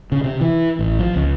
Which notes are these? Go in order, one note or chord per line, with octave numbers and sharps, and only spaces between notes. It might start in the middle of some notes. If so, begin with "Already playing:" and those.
C#3
C3
E3
A1
F3
C#2